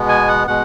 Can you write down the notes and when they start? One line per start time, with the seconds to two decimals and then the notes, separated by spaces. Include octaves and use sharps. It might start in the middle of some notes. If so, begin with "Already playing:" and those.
Already playing: B2 G#3 B3
0.09 G#5
0.28 F#5
0.47 B2 G#3 F#5